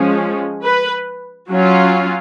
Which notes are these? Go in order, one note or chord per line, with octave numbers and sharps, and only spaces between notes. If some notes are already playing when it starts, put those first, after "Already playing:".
Already playing: F3 G#3 C#4
B4
F#3 C#4 F4